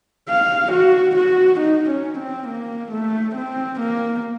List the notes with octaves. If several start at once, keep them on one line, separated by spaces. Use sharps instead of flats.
F5
F#4
F#4
D#4
C#4
C4
A#3
A3
C4
A#3